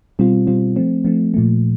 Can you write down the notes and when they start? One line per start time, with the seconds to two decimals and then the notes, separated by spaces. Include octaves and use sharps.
0.19 B2 G3 C4 F4
0.47 B2 G3 C4 F4
0.76 F3 A3 C4
1.04 F3 A3 C4
1.34 A#2 F3 A3